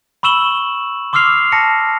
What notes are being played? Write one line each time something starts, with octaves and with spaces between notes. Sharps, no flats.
B5 C#6 E6 E7 F#7 G7
C6 D6 E6 F6 C7 F7
A5 A#6 C#7